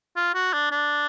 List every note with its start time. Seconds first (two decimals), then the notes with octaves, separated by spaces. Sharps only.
0.16 F4
0.35 F#4
0.53 D4
0.72 D4